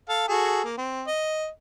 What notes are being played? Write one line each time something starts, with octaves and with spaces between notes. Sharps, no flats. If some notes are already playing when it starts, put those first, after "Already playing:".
A4 F5
F#4 G#4 A4
A#3
C4
D#5